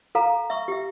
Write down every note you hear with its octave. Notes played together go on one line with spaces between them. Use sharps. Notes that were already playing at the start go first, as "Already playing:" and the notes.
A4 F5 A#5
E5 C#6
G4 E5